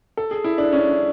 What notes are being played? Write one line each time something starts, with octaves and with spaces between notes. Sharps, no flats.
A4
G#4
E4
D4
C#4